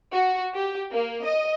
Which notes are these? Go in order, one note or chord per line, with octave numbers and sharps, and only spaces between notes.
F#4
G4
A#3
D#5